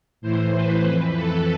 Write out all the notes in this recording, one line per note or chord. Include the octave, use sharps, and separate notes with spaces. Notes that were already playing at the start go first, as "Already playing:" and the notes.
A2 E3 C5
B4
F2 E3
A4